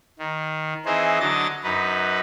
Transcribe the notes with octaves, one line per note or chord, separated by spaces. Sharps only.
D#3
E3 C4 D#4 G#4 C5
D3 F#3 D#5 A6
F#2 D#4 B4